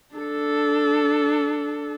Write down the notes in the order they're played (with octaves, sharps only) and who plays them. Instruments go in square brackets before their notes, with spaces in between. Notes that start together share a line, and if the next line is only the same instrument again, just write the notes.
[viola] D4 A4